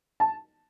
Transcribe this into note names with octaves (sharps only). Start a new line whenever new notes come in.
A5